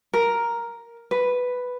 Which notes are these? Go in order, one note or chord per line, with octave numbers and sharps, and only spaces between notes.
A#4
B4